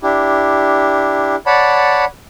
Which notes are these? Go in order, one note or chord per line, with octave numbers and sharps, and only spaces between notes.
D4 E4 G4
C#5 D5 F#5 A5 B5